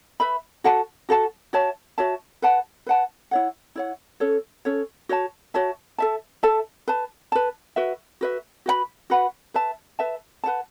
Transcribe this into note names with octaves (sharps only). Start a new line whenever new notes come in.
B4 E5 B5
F#4 A4 F#5 A5
F#4 A4 F#5 A5
F#4 C#5 E5 A5
F#4 C#5 E5 A5
B4 F#5 A5
B4 F#5 A5
E4 C#5 F#5
E4 C#5 F#5
C#4 A4 C#5
C#4 A4 C#5
F#4 C#5 E5 A5
F#4 C#5 E5 A5
A4 E5 A5
A4 E5 A5
B4 A5
B4 A5
F#4 B4 E5
F#4 B4 E5
F#4 B4 F#5 B5
F#4 B4 F#5 B5
B4 E5 A5
B4 E5 A5
B4 F#5 A5